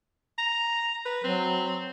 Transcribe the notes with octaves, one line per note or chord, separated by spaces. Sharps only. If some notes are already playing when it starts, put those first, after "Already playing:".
A#5
B4
F#3 C4